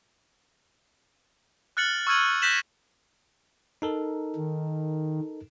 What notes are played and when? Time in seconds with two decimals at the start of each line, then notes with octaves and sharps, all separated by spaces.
1.77 F6 F#6 A6 C#7 F#7
2.07 C#6 E6 F6 G#6 D#7 F#7
2.42 F#6 G6 A#6 B6 E7 F#7
3.82 D#4 A4 A#4
4.36 D#3